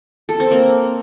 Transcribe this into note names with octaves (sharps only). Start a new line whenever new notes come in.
A4
C4
A#3